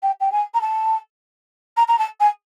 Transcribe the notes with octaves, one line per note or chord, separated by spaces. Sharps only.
G5
G5
G#5
A#5
A5
A#5
A#5
A5
G#5